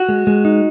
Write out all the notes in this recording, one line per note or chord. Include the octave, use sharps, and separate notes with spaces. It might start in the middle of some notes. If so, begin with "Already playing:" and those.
Already playing: F#4
G#3
G#3
D#4